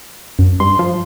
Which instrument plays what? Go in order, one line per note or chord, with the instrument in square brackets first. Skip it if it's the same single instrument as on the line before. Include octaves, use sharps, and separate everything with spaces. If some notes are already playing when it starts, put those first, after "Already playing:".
[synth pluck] F#2
[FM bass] G2 [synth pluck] C6
[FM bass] F3